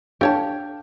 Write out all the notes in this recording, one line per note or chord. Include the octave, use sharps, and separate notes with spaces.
D4 G4 A4 C#5 F5 A5